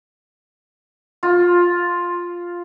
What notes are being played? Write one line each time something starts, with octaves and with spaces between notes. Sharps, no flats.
F4